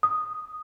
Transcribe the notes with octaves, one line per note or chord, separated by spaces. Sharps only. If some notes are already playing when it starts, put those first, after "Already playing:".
D#6